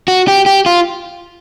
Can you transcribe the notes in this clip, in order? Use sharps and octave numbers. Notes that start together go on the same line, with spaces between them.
F#4
G4
G4
F4